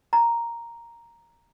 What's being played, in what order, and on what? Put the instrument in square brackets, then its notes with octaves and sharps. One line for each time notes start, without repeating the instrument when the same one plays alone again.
[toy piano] A#5